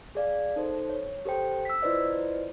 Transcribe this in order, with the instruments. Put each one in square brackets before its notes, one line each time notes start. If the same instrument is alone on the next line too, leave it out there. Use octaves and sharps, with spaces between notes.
[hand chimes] G#4 D5 F5
D#4 A4 C5
C#5
G4 A4 C5 G5
E6 B6
E4 F4 B4 C5 D5 D#5